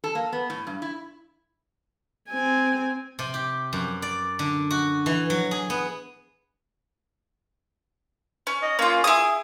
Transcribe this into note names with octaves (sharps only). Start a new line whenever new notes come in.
A4
A#3
B3
A2
G2
E4
C4 G#5
C3
G4
F#2
D5
D3
F#4
E3
F#3
G#4
B3
C#4
D#5
A#3 C#4 F4
E4 G#4 D#6